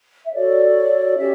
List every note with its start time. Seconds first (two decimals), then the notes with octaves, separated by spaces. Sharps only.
0.25 E5
0.32 F#4 A4 C#5 D5
1.17 C#4 G4 C#5 E5